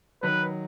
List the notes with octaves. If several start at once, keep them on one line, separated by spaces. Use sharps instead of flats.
D#3 F#3 B4